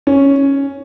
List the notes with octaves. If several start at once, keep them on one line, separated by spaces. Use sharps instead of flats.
C#4